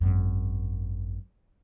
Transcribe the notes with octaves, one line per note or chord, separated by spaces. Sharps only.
G#1 F#2